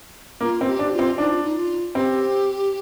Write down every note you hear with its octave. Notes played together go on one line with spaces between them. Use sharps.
A#3 F4
C4
G4
D4
G4
F4
C4
D4 D#4
F4
D#4
F4
C4 G4